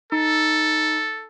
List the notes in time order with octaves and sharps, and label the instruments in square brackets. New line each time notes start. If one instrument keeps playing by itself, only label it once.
[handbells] D#4 [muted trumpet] A4